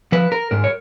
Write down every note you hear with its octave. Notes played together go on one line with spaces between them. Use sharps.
F3 B4
A#4
G#2 A#4
C#5